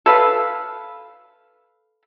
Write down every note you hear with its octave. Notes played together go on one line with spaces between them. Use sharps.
A4 B4 F5